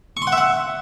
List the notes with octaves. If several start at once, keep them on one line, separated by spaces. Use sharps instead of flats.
C#6
C6
F#5
E5
F#5